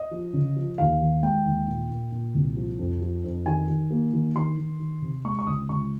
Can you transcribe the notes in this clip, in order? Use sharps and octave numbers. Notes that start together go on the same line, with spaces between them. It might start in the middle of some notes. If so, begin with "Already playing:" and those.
Already playing: D#5
F3
C#3
F3
D#2 F5
D#3
G#3 G5
D#2
A#2
A#2
A#2
C2
F3
F2
F3
F2
D#3 G#5
D#3
A#3
D#3
D#3 C6
D#3
D#3
C3
G#3 C#6
C#6
C#2 D#6
C#2 C#6